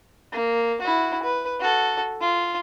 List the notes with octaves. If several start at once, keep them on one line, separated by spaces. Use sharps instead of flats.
A#3
E4 F#4
B4
F#4 A4
F4